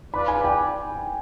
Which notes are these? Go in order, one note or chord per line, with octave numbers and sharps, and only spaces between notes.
F4 B4 D5 B5
G#5
G5